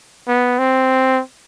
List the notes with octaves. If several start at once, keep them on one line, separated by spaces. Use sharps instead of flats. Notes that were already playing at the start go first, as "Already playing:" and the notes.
B3
C4